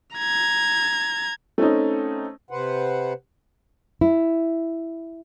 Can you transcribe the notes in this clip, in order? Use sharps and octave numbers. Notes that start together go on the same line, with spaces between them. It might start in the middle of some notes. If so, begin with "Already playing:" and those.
A#5 G#6
A3 C4 C#4 D#4
C3 B4 C5 F#5
E4